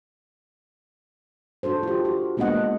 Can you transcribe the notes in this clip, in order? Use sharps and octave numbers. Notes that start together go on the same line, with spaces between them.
D4 F#4 A4 C5
F4 G4
F#4
G#3 A#3 B3 D4 D#5 F#5